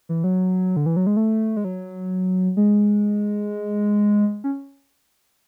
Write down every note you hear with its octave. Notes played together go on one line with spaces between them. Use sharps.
E3
F#3
D3
E3
F#3
G#3
A3
G#3
F#3
G#3
C#4